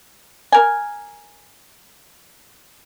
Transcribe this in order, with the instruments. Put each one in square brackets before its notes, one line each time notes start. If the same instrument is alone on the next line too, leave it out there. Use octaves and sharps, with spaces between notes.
[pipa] A#4 G#5